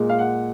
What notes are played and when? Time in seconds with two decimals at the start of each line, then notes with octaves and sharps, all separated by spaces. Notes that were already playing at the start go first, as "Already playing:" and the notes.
Already playing: A#2 G#3
0.09 F5
0.19 F#5